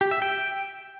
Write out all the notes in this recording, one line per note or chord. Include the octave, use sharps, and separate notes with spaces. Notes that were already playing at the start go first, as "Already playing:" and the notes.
G4
E5
G5